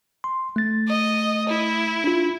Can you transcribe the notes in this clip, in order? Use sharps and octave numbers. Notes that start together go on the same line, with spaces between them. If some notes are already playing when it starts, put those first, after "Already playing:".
C6
A3 A6
D#5
E4
D4 F4